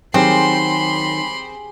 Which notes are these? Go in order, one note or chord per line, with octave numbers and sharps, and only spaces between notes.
D#3 F#3 C4 G4 G#4 B5 C6